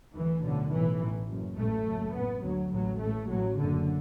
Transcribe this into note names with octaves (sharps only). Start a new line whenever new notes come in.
D2 E3
B1 A2 D3
B1 A2 E3
A1 A2
F#1 F#2
A1 A2 A3
F#1 F#2
A1 A2 B3
D2 F#3
A1 A2 F#3
A1 A2 A3
A1 A2 F#3
F#1 F#2 D3